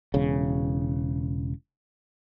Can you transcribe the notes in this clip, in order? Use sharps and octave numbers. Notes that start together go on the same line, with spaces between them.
E1 C#3